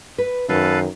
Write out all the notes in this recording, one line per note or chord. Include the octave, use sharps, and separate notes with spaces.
B4
F#2 D#3 D#4 A4 B4 F5